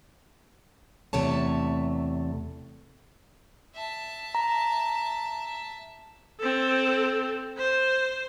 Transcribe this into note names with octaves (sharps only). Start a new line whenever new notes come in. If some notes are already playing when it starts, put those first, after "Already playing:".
E2 C3 A3 C#5 A5
E5 A5
A#5
C4 A4
C5